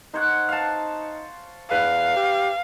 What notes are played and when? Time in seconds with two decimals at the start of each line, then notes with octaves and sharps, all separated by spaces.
0.14 D#4 C5 C#5 F#5
0.49 F5 A5
1.71 E2 B4 F5
2.16 G4